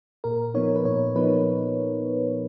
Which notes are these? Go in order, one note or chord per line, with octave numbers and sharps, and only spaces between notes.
A#2 A#4
F3 B3 D#4 C#5
B4
A#2 C#5
F3 B3 D#4 B4